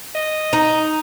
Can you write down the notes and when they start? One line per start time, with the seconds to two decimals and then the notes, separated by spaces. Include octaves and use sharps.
0.15 D#5
0.53 D#4